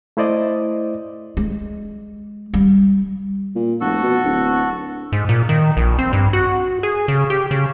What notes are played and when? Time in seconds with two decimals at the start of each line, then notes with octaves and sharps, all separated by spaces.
0.17 A3 E4 C5 D5 D#5
1.37 G#3
2.54 G3
3.55 A#2
3.81 F1 F#4 A4
4.03 B2
4.24 D1
5.12 G#2
5.29 A#2
5.49 D#3
5.77 A#1
5.99 C4
6.13 G2
6.33 F#4
6.83 G#4
7.08 C#3
7.30 G4
7.51 C#3